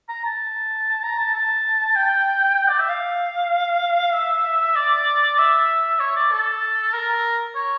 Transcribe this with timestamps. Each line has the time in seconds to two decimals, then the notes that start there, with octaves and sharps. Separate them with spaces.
0.09 A#5
0.25 A5
1.03 A#5
1.18 A5
1.34 A5
1.96 G5
2.69 D5
2.79 E5
2.89 F5
4.14 E5
4.76 D5
5.38 E5
6.00 C#5
6.16 D5
6.32 A4
6.94 A#4
7.56 C#5